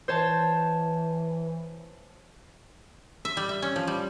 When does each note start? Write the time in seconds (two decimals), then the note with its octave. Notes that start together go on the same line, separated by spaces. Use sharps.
0.08 E3 C5 C#5 A5
3.25 E5
3.37 G3
3.49 E5
3.62 C#4
3.76 F3
3.87 G3